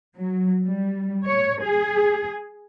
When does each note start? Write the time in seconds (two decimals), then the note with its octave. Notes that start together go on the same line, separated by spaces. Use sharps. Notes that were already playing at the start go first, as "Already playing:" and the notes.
0.19 F#3
0.65 G3
1.26 C#5
1.63 G#4